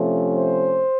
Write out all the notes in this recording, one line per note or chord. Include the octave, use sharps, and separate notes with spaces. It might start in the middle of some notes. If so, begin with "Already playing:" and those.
Already playing: C3 F3 A3 C#4
C5